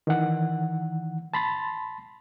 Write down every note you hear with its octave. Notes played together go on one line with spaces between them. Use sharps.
D#3 E3 F#5
A5 B5 C6 A6